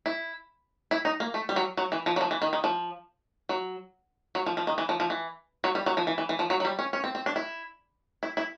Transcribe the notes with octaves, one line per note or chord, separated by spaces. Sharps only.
E4
E4
D#4
A#3
A3
G3
F#3
F#3
E3
F3
F#3
F3
E3
D#3
D#3
F3
F#3
F#3
F3
F3
D#3
E3
F3
F3
E3
F#3
G3
F#3
F3
E3
E3
E3
F3
F#3
F#3
G3
C#4
C#4
C4
C4
D4
E4
E4
E4